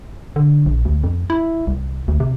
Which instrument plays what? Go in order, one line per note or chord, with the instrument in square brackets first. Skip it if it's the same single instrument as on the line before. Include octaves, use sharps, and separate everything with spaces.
[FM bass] D3
A#1
D2
F2
E4
C2
D2
C3